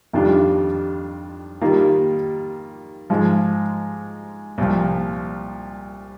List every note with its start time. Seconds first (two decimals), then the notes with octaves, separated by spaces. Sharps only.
0.13 F2 D#3 G3 D4 F4
1.61 D#3 G3 A#3 F4
3.10 G#2 F3 G#3
4.58 C2 A#2 F3